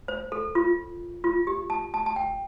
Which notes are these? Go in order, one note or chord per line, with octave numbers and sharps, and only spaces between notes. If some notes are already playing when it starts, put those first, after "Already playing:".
C5
A4
F4
F4
G4
A5
A5
A5
G5